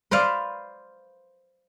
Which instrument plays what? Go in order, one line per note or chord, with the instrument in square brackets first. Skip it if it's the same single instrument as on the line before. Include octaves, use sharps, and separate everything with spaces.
[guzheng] B4 C5 D5 F5